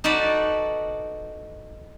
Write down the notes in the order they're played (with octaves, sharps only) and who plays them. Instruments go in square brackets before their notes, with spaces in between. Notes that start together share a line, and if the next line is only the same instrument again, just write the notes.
[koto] D#4 F#4 A4 B4 D5